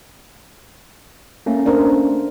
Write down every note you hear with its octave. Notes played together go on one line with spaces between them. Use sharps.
A3 A#3 C#4
D4 A#4 C5